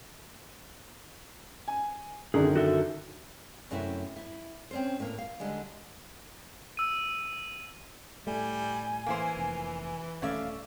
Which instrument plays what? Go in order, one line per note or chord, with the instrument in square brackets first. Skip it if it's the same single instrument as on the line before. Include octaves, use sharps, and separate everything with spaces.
[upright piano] G#5
[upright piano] F#2 D3 D#3 [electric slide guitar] G#4
[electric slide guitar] F#4 A4 E5
[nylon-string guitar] F#2 C3 A3 E4
E4
C4 C#4 C5
A2 A#3
F5
D3 G3 G#3
[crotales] E6 D#7
[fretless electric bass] A2 A3 [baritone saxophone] G3 [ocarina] G#5
[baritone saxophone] E3 [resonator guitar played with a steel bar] A#3 E4 C5
[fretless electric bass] F1
[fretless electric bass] D#1 A3 [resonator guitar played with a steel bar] C#4 D5 E5 [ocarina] F5